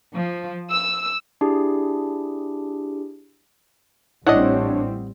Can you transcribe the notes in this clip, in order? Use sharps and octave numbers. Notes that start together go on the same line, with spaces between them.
F3
E6
D4 E4 G4 G#4
A1 G3 C4 D4 E4 C#5 D#5 F#5